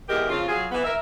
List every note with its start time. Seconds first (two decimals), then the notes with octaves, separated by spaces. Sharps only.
0.09 E2 G#3 G4 A#4
0.29 F2 C#3 F4
0.48 F#3 F4 G#4
0.71 E3 B3
0.84 A#4 E5